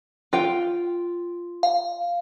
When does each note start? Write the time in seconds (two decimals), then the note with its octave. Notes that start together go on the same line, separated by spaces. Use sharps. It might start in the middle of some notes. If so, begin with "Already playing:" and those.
0.33 F4 G5
1.63 F5